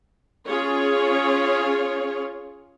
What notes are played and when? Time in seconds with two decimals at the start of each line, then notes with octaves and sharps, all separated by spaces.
0.47 C#4 F4 G#4 C#5